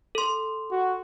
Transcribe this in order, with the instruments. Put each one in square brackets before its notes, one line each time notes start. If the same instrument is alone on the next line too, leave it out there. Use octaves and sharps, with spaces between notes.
[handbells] A4 C6
[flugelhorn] F#4